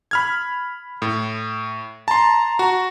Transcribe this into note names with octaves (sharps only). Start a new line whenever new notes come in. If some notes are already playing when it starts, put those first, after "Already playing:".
B5 F6 G#6
A2
A5 A#5 C6
F#4